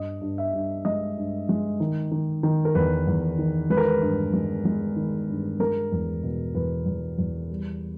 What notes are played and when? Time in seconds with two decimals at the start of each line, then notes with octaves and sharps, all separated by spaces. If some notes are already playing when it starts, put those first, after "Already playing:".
Already playing: G2 D#5
0.21 G2
0.38 E5
0.53 G2
0.85 G#3 D#5
1.17 G2
1.49 G#3
1.80 D#3
2.12 D#3
2.43 D#3
2.65 A#4
2.75 E2 B4
3.07 E2
3.38 D#3
3.70 G#3 B4
3.77 A#4
3.85 B4
4.01 G2
4.33 G#3
4.65 G#3
4.96 D#3
5.29 G2
5.60 G#3 A#4
5.92 E2
6.23 B2
6.55 E2 B4
6.86 E2
7.19 E2
7.50 G3